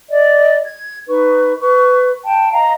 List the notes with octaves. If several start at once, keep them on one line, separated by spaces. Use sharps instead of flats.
D5 D#5
G#6
D#4 B4 C#6
B4 C#6
G5 A5
D#5 F5 A#5